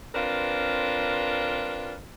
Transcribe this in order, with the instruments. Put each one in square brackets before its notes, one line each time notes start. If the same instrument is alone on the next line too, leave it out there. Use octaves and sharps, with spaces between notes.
[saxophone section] C4 D4 F4 A#4 B4